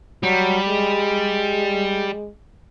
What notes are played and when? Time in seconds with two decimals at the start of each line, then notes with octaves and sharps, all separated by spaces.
0.23 F#3 G3
0.68 G#3